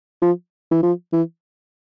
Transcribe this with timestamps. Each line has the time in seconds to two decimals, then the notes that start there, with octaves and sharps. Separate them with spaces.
0.22 F3
0.71 E3
0.83 F3
1.13 E3